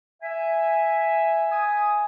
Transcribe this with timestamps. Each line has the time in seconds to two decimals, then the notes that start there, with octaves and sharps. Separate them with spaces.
0.23 E5 G#5
1.51 G#5 D#6